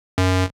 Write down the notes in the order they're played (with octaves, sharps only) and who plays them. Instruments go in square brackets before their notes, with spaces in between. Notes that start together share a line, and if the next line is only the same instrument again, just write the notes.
[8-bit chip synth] F#2